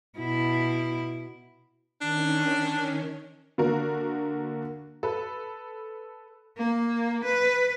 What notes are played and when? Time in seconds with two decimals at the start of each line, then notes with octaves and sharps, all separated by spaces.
0.19 B2 E4
2.01 D#3 C#4 D4
3.58 D3 A#3 F#4 A#4
5.03 A4 B4
6.57 A#3
7.25 B4